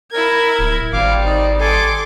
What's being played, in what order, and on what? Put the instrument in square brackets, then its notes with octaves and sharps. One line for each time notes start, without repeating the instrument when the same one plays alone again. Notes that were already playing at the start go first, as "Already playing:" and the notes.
[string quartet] E4 G#6 [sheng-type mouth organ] A#4
[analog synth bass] D1
[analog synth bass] G#1 [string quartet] G3 C4 [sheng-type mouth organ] F5 D6
[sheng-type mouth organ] D#4 D5
[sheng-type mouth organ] A4 G#5 [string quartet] C6 D6